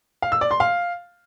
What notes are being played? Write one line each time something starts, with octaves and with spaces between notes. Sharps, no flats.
F5
E6
D5
C6
F5